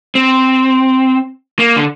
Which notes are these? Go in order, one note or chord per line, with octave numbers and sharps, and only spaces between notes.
C4
A#3
D3